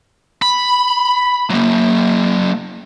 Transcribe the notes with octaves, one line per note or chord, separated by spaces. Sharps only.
B5
F#3 A#3